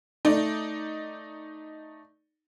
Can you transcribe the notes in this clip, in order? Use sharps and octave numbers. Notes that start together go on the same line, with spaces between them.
A3 D#4 D5